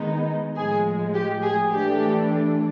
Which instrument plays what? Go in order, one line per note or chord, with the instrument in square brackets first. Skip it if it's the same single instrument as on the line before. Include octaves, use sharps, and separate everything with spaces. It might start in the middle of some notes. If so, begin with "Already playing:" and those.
Already playing: [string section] D#3 G#3 B3 D#4
A2 F3 G#3 G#4
G4
G#4
E3 A3 D4 G4